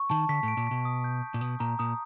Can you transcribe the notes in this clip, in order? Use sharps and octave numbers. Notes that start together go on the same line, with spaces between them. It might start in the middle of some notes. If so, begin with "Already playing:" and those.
Already playing: C#6
D#3 A5
D3 B6
A2
D7
A#2
B2 B6
D#6
G6
D#6
A#2
B2 D#6
A#2 A#5
A#2 D#6